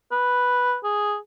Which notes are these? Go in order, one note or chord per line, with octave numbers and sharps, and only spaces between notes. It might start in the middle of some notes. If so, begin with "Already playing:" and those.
B4
G#4